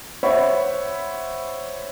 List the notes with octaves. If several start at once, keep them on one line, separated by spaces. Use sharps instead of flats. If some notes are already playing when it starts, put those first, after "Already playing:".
C5 C#5 E5 F#5 B5